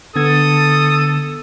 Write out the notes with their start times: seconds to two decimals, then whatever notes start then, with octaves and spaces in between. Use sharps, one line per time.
0.16 D3 B3 A4 D#6 G#6